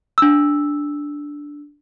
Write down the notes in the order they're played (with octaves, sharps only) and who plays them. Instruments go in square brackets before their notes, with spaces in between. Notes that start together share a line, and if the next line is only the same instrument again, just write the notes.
[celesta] D4 E6